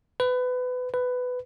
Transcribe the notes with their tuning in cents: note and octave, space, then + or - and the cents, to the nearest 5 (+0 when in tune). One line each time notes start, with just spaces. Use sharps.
B4 +25
B4 +15